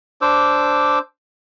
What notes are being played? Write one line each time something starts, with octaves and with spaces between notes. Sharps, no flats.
D4 C5 D6 E6